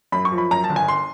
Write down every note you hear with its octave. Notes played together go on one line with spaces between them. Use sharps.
F#2 B5
C#6
F3
B5
F#2 A#5
A5
G1
G#5
C6